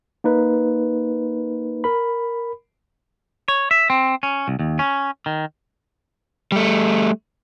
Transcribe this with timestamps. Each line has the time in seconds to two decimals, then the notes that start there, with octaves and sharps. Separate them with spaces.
0.24 A#3 D#4 B4
1.84 A#4 B5
3.48 C#5
3.71 E5
3.90 C4
4.23 C#4
4.48 C2
4.59 D#2
4.79 C#4
5.26 D#3
6.52 G3 A3